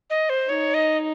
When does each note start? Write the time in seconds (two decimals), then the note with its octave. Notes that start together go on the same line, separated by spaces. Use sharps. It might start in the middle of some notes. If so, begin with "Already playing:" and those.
0.10 D#5
0.30 C5
0.48 D#4 C#5
0.74 D#5